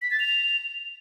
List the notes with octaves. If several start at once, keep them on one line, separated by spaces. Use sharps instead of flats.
B6
A6
F7